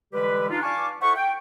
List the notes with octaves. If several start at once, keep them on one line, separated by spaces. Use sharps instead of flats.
D3 E3 G3 G#3 G4 B4
D4 D#4 F4
D5 F5 G#5 A5 C#6 D6
E4 A4 C5 E5 F#5 C#6
G5